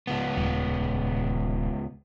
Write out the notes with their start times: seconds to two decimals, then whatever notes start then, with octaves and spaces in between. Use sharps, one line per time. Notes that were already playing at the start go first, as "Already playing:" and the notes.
0.07 C#2 B3
0.37 D#1